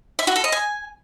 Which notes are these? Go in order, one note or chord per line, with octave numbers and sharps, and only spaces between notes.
E5
F#4
A4
D#5
G#5